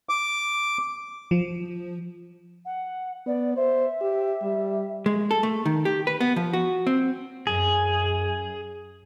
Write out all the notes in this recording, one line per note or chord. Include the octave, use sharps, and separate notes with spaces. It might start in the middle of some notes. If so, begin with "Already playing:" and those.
D6
F3
F#5
B3 D5
C5 E5
G4
G3
G#3
A4
A3
D#3
G4
B4
B3
F3
F#4
C4
F#2 G#4